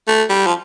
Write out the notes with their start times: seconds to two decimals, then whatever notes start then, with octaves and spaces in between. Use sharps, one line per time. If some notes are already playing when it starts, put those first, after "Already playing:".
0.08 A3
0.30 G3
0.46 F3